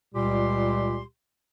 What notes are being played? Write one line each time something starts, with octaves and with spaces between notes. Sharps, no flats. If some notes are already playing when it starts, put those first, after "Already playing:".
C#2 A#2 G3 G4 C6